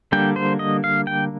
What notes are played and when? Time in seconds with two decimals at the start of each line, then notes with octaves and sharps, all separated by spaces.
0.12 D3 G3 A#3 D4 G5
0.36 C5
0.59 D#5
0.84 F5
1.07 G5